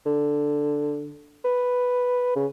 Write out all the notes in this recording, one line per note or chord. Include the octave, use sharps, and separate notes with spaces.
D3
B4
C#3